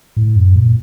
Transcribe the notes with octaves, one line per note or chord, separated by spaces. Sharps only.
A2
F#2
A#2